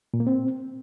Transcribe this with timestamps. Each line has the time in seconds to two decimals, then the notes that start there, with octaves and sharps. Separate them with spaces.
0.14 A#2
0.20 A#3
0.27 C4